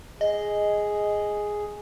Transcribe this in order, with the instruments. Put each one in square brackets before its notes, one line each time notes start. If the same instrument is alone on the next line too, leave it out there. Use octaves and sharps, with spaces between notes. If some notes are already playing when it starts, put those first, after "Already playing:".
[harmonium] G#4 [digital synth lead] D#5